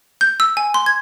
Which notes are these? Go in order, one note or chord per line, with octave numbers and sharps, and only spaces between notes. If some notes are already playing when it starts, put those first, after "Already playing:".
G6
E6
G#5
C6
G#6